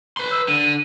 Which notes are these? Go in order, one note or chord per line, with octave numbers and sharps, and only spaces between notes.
B4 C6
E6
D3 D#7